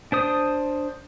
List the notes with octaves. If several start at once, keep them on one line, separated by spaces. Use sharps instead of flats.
D4 C5 D#6